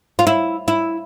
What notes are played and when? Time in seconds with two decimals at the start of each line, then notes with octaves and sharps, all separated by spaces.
0.19 F4
0.27 E4
0.68 E4